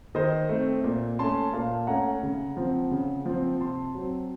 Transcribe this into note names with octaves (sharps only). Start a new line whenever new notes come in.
D#3 C5 D#5
A3 C4
A#2
A3 C#4 A5 C6
A#2 F5 A5
A3 C#4 F#5 A#5
C#3
F3 C4
C#3
F3 C4
C3 A5 C6
F#3 C4